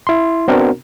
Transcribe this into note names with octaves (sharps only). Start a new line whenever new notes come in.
E4 C6
B3 C4 D4 F#4 A#4